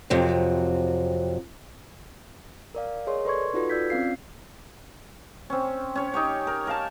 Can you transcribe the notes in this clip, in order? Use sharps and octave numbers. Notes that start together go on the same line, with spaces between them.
F2 C3 F#3
A#4 D5 F5
G#4 A#4 C#5 D#5 C6
A4 B4 D5 C6 C#6 G#6
D#4 F4 F#4 A4 B4
F4 D5 E6 G6 G#6 B6
C4 C#4 F5 C7
C4 C#4
C#4 C#5
D#4 G4 C#5
A#4
A#4 F5 A5